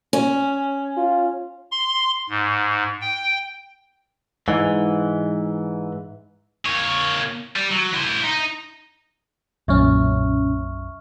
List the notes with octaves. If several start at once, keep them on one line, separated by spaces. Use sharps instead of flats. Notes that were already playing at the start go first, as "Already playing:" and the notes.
C#4
F4
C6
G#2
G5
G#2 E3
A#3 C#5
G3
F#3
E4 C5
D#4
B1 F#2 A#2 C#4 E5 C#6 F6